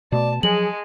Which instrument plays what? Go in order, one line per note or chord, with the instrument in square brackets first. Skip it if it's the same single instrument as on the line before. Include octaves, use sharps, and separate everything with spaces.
[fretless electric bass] B2 A3 B3 [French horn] D5 [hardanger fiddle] A5
[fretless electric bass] F3 F#3 [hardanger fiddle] G#3 [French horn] G#4 [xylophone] F#7